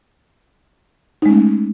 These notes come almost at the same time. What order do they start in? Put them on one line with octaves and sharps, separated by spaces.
D#4 G#3 C#4 A3